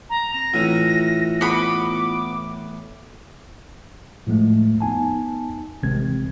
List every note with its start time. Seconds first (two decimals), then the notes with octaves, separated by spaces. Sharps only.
0.10 A#5
0.34 C4 A#6
0.54 A2 E3 C#4 E4 F4
1.41 B3 B5 D6
4.27 A2 F3 G#3 A3
4.80 B3 D#4 G#5 A5
5.83 A1 C3 D#3 G#3 C4 G#6